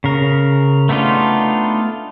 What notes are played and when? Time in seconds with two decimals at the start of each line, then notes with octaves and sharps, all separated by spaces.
0.04 C#3 A#4
0.89 A3 B3 D4 D#4 F4